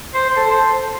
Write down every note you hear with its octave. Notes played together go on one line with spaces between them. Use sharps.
C5
C5
A4
C5